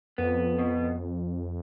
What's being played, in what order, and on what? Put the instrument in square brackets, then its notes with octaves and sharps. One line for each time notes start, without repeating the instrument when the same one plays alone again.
[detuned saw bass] F2 [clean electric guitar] B3
[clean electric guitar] B2